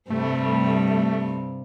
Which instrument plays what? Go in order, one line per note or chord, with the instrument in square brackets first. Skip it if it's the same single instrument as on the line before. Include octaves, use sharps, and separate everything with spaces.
[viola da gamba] G2 C3 G3 [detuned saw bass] A3